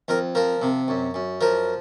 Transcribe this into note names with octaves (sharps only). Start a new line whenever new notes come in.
F2 A#4
F3 A#4
C3
F#2
F#2
F3 A#4